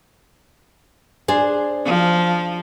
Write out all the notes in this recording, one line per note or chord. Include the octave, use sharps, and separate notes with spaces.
D4 G#4 C5
F3